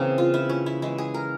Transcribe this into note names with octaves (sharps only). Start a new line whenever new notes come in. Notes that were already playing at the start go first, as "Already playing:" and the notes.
Already playing: C#3 E3 A#3 C4
F4
E4
C#4
E4
E3 G#3 E4
G#4
A#4